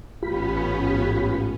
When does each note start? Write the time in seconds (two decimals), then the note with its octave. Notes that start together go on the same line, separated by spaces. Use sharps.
0.23 A1 G#2 A3 B3 C#4 F4 G4 B5